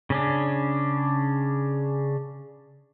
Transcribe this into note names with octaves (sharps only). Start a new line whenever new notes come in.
C#3 C#4 D4